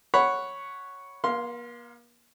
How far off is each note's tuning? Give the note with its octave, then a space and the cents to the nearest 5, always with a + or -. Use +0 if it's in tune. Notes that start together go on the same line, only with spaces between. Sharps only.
C#5 +0 F#5 +0 B5 +0
A#3 +45 F5 +0 C6 +0